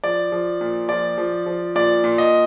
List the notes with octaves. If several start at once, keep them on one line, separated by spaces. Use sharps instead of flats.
F3 D5
F3
A#2
F3 D5
F3
F3
A#2 D5
A#2
D#5